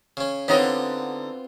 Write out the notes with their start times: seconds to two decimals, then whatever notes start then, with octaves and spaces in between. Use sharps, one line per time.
0.17 C#3 C#4
0.48 D3 B3 C4 D#4 F4 C#5 D#5